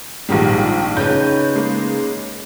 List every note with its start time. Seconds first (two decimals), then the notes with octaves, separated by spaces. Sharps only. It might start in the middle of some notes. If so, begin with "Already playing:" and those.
0.29 A#1 G#2 D#3 G3
0.97 C#3 D#4 B4 G6
1.56 G#3 A#3